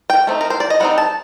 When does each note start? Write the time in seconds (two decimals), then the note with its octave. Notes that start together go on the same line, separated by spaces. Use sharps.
0.10 G5
0.27 A3 C4 D#4
0.41 A#4
0.50 C5
0.60 D5
0.70 D#5
0.80 G3 C4 D#4 F#5
0.98 A5